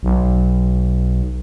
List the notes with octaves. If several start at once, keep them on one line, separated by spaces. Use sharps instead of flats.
B1